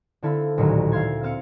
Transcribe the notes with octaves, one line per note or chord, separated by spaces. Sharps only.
D3 C4 E4 A4 F5 B5
A1 D2 A#2 D#3 F#3
E5 F5 C6 G#6
C4 F5 C#7